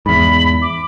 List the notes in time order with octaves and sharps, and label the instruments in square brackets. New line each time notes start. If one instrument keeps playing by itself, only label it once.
[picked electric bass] E2 G#2 [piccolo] B5
[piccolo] D6